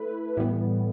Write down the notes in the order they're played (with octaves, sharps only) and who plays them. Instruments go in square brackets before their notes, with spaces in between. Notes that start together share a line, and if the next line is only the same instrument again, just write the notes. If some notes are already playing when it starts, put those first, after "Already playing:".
Already playing: [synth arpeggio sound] A3 E4 B4
A2 E3 G3 B3